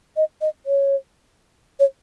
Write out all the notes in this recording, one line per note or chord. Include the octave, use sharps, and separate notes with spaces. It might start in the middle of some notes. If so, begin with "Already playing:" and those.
D#5
D#5
C#5
C#5